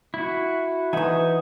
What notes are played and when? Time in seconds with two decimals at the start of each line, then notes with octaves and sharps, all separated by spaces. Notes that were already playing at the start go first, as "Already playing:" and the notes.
0.14 E4 F#4
0.93 E3 D#4 B4 E5 F#5 G#5 D#6